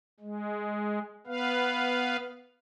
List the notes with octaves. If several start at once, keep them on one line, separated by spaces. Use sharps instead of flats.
G#3
B3 B4 F5